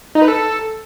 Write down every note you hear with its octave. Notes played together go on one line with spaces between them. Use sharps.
D#4
B4
A4